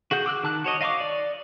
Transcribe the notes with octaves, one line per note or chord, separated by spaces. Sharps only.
F#4 G#4 F#5 G6
D6 E6 F#6
D#3 A5 F#6
F#4 C#5 D#5
D#5 F5 A5 C#6 D6
D5